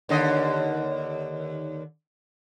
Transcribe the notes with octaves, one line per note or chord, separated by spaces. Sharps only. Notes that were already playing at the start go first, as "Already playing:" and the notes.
D#2 D3 D#5